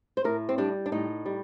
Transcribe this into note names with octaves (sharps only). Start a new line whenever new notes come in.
C5
A2 A#4
C4
G3 D4
D4
A2 D#4
G3